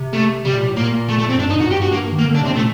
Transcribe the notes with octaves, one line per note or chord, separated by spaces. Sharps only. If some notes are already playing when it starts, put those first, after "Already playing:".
Already playing: C3
A3
C3 G3
A#2
A2
A#2 A#3
A3
A3
C4
F#2
G2 D4
F#2 D#4
A2
G2 F#4
G2 G4
F#4
A#3
D#3
A#3
D3
D4
C3
C4
A#2 A3